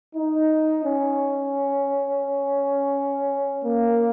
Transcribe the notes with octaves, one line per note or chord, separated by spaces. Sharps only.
D#4
C#4
A#3